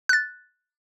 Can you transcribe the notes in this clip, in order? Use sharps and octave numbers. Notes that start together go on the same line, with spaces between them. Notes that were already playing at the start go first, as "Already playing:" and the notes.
F#6 A6